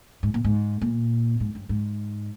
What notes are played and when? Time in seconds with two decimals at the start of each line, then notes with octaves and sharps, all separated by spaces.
0.23 G#2
0.34 A#2
0.44 G#2
0.81 A#2
1.40 G#2
1.55 G2
1.69 G#2